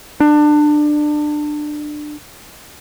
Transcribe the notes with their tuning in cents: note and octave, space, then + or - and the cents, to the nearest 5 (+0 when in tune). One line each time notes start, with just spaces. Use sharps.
D4 +25